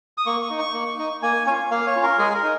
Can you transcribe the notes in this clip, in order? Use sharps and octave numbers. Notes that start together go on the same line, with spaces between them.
D#6
A#3 C#6
C#6
D#4
C#6
A#3
D#4
A#3 G#5
C#4 F4 G#5
A#3 F5
C#5
C#4 F4
A#4
G#3 G#4
A#4
D#4